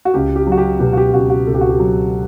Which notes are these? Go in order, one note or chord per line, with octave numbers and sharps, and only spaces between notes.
F#4
C#2 G4
G4
F#3
F#4
G4
B2 G4
F#4
G4
C#2 F#4
F#4
C#2 A4
G4
F#4
G4
F#3